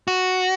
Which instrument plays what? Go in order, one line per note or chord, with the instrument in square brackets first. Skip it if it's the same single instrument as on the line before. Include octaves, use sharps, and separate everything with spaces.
[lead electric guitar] F#4